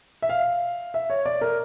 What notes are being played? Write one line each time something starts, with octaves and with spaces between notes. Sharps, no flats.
E5
F5
E5
C#5
D5
A#4